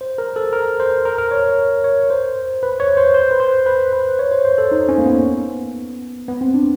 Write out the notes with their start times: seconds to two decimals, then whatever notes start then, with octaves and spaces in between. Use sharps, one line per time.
0.01 C5
0.18 A#4
0.36 A4
0.53 A#4
0.80 C5
1.05 A#4
1.18 A#4
1.31 C#5
1.84 C#5
2.10 C5
2.63 B4
2.80 C#5
2.97 C5
3.14 C5
3.31 B4
3.40 C5
3.66 B4
3.93 B4
4.19 C#5
4.31 C5
4.45 C5
4.58 A4
4.71 D#4
4.88 C#4
4.98 A#3
5.06 B3
6.28 B3
6.41 C4
6.54 D4